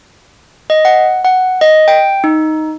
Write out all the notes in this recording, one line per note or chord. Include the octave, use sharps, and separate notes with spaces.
D#5
F#5
F#5
D#5
G5
D#4